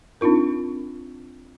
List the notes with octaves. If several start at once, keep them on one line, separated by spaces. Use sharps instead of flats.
C4 D4 D#4 F4 A#4